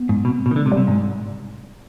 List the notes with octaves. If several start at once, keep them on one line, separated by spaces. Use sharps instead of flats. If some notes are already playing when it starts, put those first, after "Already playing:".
Already playing: B3
G#2
B2 C4
B3
C4
B2
D#3
D3 G#3
C3
G3
C3
G#2